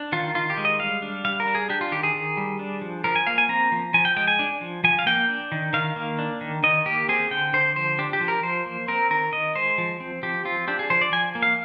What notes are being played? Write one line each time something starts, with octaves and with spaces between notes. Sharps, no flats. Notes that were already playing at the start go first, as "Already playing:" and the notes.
Already playing: D4
D#3 F4
D#3 F4
G4
G#3
D#5
G3 F5
D4
G3 F5
A#4
D4
G#4
D4 G4
F4
D#3 G4
G#4
D#3
G3
D4
F3
F3 A#4
G#5
A#3 F5
G#5
C4 A#5
F3
F3 G#5
G5
G#3 G5
G#5
D4
F3
F3 G#5
F5
A#3 G5
D4
D#3
D#3 F5
A#3
D4
D#3
D#3 D#5
A#3 G4
C4 G#4
D3 G5
D3 C5
F3 C5
D4 G4
G4
F3
A#4
F3 C5
A#3
C4 A#4
D#3 A#4
D#3 D#5
G#3 C5
F3
C4
F3 G4
C4 F4
D4 G4
G#4
F3 C5
D5
F3 G#5
A#3
F5